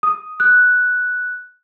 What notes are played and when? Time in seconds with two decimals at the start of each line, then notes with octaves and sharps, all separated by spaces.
0.03 D#6
0.40 F#6